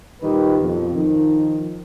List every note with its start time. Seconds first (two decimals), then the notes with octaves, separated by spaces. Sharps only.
0.22 A#2 D#3 G3 G4 B4
0.59 F2 B2
0.93 D#3 F3